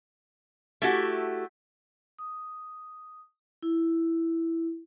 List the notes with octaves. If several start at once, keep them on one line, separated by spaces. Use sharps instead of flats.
A3 E4 F#4 G4
D#6
E4